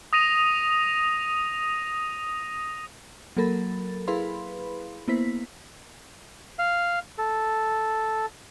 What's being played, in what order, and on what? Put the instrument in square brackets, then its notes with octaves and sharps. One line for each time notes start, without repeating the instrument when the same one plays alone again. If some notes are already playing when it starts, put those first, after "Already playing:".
[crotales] D#6 A#6 D#7 F7
[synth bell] F#3 A#3 A4 A#4 B5 A6
E4 G#4 B4 F5 B5 C6
A#3 B3 E4 C5 B6
[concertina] F5
A4